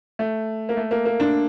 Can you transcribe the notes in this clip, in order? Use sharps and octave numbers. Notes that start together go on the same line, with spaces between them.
A3
A#3
A3
A#3
A#3
D4